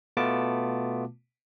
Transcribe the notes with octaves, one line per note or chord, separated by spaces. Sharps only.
B2 A3 B3 F4 A5 D6